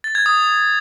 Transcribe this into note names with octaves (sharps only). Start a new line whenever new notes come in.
A6
G#6
D#6